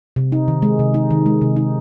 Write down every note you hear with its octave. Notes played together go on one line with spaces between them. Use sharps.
C3
D#4
D#3
G#3
C3
D#4
D#3
G#3
C3
D#4